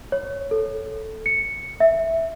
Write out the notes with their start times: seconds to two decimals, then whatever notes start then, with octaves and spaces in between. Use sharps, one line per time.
0.12 C#5
0.51 A4
1.26 C#7
1.80 E5